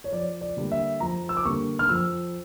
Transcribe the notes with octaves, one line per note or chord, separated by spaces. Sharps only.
C#5
F2 D5
D5
D3 G3 A#3
E5
F2 A#5
E6
D6
D3 G3 A#3 C#6
F6
F2 E6